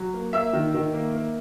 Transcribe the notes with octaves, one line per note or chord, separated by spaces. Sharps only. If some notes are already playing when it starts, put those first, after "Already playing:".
Already playing: F#3
A#3
A#3 E5 E6
D#3
D#3
A#3
A#3